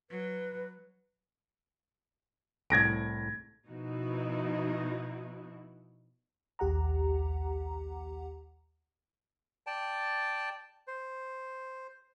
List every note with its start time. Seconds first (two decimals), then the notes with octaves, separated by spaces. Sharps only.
0.10 F#3 B4
2.70 C2 A2 G#6 A#6 D7
3.67 B2 F3 D#4 E4 F#4
6.59 A#1 D#2 G4 F#5 A#5
9.67 D5 G5 A5
10.88 C5